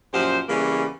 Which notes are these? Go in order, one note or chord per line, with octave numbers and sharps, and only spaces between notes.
F#2 A#2 F3 G4 C5
C#3 E3 G3 A#3 B3 C#4